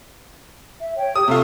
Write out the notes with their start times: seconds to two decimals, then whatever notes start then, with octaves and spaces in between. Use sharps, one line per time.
0.80 E5
0.96 C#5 G5
1.15 G4 D#6
1.28 C3 F4 A4 E5 C#6